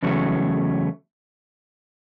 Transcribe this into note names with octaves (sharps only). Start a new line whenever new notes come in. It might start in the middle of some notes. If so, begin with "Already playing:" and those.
E2 C#3 F#3 A3